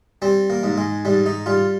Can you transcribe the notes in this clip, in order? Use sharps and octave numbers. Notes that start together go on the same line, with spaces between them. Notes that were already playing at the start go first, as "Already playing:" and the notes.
G3 C4
A#3
G#2
G#3
G#2 G3
D#4
G3 F4